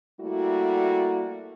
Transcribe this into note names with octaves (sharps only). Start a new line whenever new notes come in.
G3 A3 A#3 E4 F#4